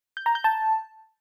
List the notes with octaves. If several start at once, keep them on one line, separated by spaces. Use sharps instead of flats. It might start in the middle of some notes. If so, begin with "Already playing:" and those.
G6
A#5
G6
A5